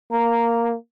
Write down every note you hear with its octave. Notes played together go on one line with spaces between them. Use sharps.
A#3 A#5